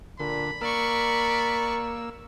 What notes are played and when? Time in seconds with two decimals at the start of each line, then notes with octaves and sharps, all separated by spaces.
0.20 A#2 D3 B5
0.61 A#3 A#4 D5 C#6 E6